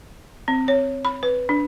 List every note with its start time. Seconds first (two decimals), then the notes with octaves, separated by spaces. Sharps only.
0.48 C4
0.68 C#5
1.05 B5
1.23 B4
1.49 D4